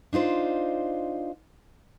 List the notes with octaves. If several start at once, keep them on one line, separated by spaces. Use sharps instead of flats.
D4 D#4 F4 C5